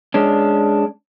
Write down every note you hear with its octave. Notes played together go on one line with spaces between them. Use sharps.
G#3 C#4 D4